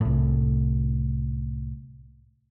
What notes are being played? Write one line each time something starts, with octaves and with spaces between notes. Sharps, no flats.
C2 A2